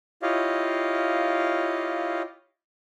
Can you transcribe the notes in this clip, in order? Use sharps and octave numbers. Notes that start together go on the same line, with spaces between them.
E4 F4 G4 C#5 D#5 F5